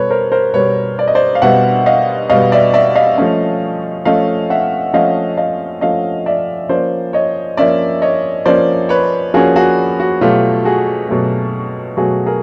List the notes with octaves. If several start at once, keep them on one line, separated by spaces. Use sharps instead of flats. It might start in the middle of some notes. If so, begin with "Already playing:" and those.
Already playing: B2 G3 B3 A4 B4 C#5
A#4 C5
A#4 C5
B2 G3 B3 B4 C#5
D5
D#5
C5 D5
F5
B2 G3 B3 E5 F#5
D#5 F5
B2 G3 B3 D#5 F5
D5 E5
D5 E5
D#5 F5
F3 A3 C#4
F3 A3 C#4 D#5 F5
E5 F#5
F3 A3 C#4 D#5 F5
D#5 F5
F3 A3 C#4 D#5 F5
D5 E5
F3 A#3 C#4 C5 D5
C#5 D#5
F3 A#3 C#4 D5 E5
C#5 D#5
F3 A#3 C#4 C5 D5
B4 C#5
F3 A#3 C#4 F#4 G#4
F#4 G#4
F#4
B2 F#3 A3 F4 G4
F#4 G#4
B2 F#3 A3
B2 F#3 A3 F#4 G#4
G#4 A#4